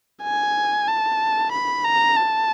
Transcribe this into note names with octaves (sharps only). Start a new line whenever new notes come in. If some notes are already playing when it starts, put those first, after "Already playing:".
G#5
A5
B5
A#5
A5